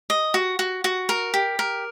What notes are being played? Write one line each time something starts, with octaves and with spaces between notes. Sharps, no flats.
D#5
F#4
F#4
F#4
A#4
G4
A#4